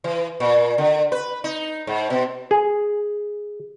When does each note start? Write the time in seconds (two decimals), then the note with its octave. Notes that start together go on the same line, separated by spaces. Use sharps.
0.04 E3
0.40 A#2
0.78 D3
1.12 B4
1.44 D#4
1.87 G#2
2.10 B2
2.51 G#4